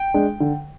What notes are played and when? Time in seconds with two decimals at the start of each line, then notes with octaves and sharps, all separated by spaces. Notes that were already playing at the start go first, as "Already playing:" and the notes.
Already playing: G5
0.14 G#3 D4
0.40 D3